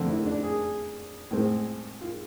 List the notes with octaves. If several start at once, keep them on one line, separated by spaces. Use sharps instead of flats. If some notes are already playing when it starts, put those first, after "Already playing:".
Already playing: F2 D3 A3 C4
E4
D4
G#4
A2 G#3 C4
F4